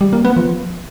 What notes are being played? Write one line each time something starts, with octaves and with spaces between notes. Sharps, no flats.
G3
A#3
B3
F3